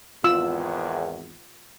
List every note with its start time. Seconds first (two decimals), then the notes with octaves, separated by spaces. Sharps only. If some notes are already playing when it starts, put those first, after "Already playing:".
0.24 G#1 E2 F4 E6